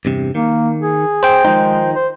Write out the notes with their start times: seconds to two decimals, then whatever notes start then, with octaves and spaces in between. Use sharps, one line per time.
0.05 E2 G2 C3
0.35 D#3 A#3
0.82 G#4
1.23 C5 G5
1.45 D#3 F3 G#3 D#4
1.94 C5